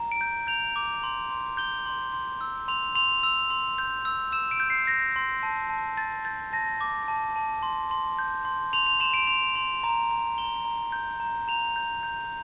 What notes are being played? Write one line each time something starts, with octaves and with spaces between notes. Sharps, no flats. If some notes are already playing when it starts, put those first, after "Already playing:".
Already playing: A#5
D7
G6
G6 F7
D6
C6
C6
G6 G7
C6
C6
E6
C6 F7
C6 F7
E6 F7
C6
G6
E6
E6 E7
D7
G6
C7
G6 A#6
C6
A5
A5
A5 A6
G6 A6
A5 A#6
D6
A5
A5
C6
C6
G6
C6
C6 F7
F7
C6 E7
D7
C6 F7
C6
A#5
A#5
A#5 G7
A#5
G6
A#5
A#5 F7
G6
G6